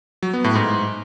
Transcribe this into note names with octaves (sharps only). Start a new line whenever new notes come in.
F#3
B3
A2
G#2